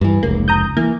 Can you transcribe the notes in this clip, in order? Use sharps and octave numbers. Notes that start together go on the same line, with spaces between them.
G2 E3
F1 C#2 A#3
A#5 D#6 G6
E3 A#3